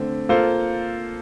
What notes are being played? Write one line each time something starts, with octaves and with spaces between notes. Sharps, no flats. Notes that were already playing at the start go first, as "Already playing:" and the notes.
Already playing: D3 A3 C4
A#3 F4 A4 C5